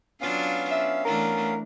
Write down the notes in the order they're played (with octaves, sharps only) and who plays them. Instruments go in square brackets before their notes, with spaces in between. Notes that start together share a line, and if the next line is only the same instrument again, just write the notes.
[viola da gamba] F#3 D4 F4 [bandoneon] B3 C#4 F5
[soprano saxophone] E5
[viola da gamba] E3 A3 D4 [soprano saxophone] A#4